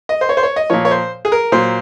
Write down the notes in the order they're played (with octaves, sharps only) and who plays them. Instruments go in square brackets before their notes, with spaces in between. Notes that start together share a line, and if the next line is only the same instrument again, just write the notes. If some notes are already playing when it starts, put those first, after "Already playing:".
[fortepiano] D#5
C5
C#5
C5
C#5
D#5
A#2 F3 C#5
C#5
C5
G#4
A#4
A#2 F#3 C5